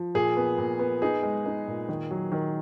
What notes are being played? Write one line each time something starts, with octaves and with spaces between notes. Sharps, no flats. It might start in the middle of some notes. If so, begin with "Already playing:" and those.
Already playing: F3
A#2 G#4
B3
A#2
B3
D#4 G#4
G#3
D#4
A#2
D#3
F#3
D#3